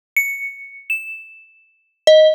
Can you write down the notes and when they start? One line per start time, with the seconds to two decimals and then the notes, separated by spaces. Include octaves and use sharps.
0.17 C#7
0.90 E7
2.07 D#5